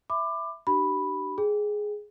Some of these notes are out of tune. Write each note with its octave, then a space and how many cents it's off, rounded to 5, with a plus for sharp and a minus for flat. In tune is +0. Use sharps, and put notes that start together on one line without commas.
E5 +0 B5 +25 D6 +20
D4 +35 G4 -40 B5 +0
G#4 +5 G5 +20